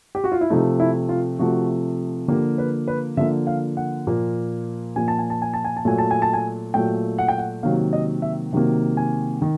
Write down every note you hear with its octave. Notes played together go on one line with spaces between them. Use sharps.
G4
F#4
F4
E4
C3 F3 A3 D#4
E4
F4
C3 F3 A3 F#4
D3 F3 A#3 G4
B4
B4
D3 F3 A#3 E5
F5
F#5
A#2 F3 A#3
A#2 F3 A#3 G#5
A5
G#5
A5
G#5
A5
G#5
A5
A#2 F#3 A3 G#5
A5
G#5
A5
G#5
A#2 F#3 A3 G5
F#5
G5
F#5
C3 D#3 F#3 A#3 F5
D#5
E5
C3 D#3 F#3 A#3
G#5
D#3